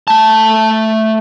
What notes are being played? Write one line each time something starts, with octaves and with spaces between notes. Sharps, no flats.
A3 A5